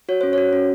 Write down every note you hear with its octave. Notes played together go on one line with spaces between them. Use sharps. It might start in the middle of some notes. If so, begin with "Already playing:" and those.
F#4 C#5
C#4 C5
F#4 C#5
C#4